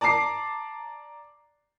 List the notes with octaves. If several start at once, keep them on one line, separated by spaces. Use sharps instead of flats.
D5 A5 A#5 D6 C7